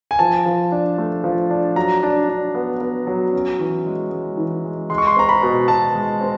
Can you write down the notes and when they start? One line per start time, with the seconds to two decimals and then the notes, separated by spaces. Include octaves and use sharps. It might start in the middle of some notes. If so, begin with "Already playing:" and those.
0.11 G#5
0.19 F3 A5
0.46 F3
0.72 D4
0.98 A3
1.24 F3
1.51 D4
1.76 F#3 A#5
2.03 D4
2.29 D4
2.55 B3
2.81 B3
3.07 F#3
3.33 C#4
3.59 E3
3.86 G#3
4.11 G#3
4.37 E3
4.65 G#3
4.90 G#3 C6
4.98 C#6
5.07 C6
5.16 C4 A#5
5.29 B5
5.42 B2
5.68 B2 A5
5.95 G#3
6.21 C4